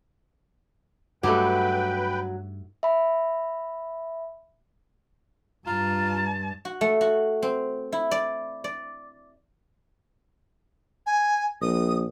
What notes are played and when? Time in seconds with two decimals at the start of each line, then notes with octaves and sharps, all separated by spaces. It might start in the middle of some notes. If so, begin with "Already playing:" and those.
1.23 G2 F#3 A3 D#4 G4 B4 G5 B5
2.83 E5 B5
5.67 G2 F4 A5 A#5
6.65 F#4
6.81 A3
7.01 F#4
7.42 C4
7.92 E4
8.11 D5
8.64 D5
11.06 G#5
11.62 A#1 D#6